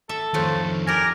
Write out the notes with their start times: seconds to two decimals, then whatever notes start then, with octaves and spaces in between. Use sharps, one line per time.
0.09 A4 E5
0.34 F2 D#3 F3 F#3 A3
0.87 G4 A#4 D5 G#5